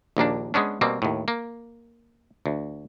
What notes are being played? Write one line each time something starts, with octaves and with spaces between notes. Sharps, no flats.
A#1 D#2 A#3 D4
G#3 B3 C#4 D4
B2 G3 A#3 C4
D#2 A2
A#3
D2